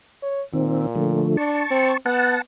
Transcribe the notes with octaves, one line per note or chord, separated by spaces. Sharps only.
C#5
A#2 D#3 C4
D3 F3 A3
D4 A5 C#6
C4
B3 F#5 A5